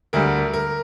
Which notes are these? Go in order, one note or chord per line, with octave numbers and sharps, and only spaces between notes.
D2 D3 G3 A#4
A#4